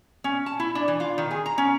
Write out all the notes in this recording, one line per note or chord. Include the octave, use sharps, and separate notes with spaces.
C#4
A5
E4
D4
E3
F4
D#3
G#4
A#5
C#4